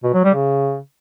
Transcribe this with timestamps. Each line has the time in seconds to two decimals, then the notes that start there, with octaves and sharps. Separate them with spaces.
0.04 B2
0.14 F#3
0.24 G3
0.34 C#3